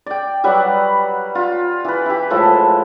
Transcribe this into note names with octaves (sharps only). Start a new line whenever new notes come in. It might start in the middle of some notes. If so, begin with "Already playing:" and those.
D5 G5
F#3 G3 B4 F#5
F4
E3 B4
E4 G4
A2 F3 G#3 A4